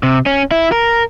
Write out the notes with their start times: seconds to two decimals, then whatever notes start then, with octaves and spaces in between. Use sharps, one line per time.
0.03 C3
0.26 C#4
0.51 E4
0.72 A#4